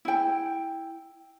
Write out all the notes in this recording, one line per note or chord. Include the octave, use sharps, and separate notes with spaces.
E4 G5